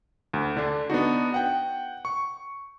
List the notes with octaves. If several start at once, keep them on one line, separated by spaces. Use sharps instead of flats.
D2
D3 D4
B3 D4 D#4 F#4
F#5 G5
C#6